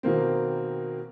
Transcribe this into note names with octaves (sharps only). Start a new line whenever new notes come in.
B2 D#3 A#3 C4